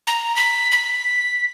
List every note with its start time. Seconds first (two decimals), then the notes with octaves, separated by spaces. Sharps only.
0.07 A#5
0.36 B6
0.72 B6